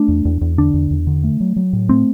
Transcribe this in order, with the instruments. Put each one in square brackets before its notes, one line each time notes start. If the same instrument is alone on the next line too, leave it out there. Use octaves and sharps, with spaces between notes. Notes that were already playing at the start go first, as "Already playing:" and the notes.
Already playing: [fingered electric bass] A3 [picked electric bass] D4
[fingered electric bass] E2
E2
E2
[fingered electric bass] D3 [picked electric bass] D4
[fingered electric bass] E2
E2
D3
A3
F#3
F#3
A2
[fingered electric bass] A3 [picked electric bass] C4